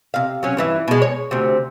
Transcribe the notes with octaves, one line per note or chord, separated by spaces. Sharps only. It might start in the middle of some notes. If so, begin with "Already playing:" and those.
C3 F5
F#3 C#4
G2 E3 E4
B2 G#3
C#5
D2 C3